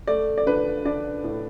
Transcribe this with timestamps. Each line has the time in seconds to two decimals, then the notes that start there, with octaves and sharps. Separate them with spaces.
0.07 A3 D5
0.38 D5
0.46 D4 B4
0.85 D4 D5
1.24 A2